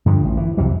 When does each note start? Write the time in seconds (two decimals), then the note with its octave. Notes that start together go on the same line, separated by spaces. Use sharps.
0.06 G2 D3 F3
0.25 A1
0.37 E3
0.57 C2 F2 F#3 G3